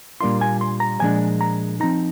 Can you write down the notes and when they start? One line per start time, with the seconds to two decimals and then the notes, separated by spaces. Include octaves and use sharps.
0.21 A#2 G3 A#3 D4 F4 C6
0.41 G#5
0.61 C6
0.80 A#5
1.00 A#2 F3 G#3 D4 G#5
1.41 A#5
1.80 F3 C4 D#4 A#5